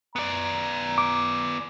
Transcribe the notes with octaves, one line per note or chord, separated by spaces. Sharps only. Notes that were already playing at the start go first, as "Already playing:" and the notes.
B3 D5 A#5
D6